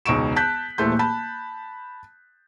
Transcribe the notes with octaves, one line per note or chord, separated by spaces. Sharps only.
E1 C#2 D#4 C#6 D7 E7
A5 F#6 G6 B6
D#1 A#1 E3 A3 C6 G6
A5 B5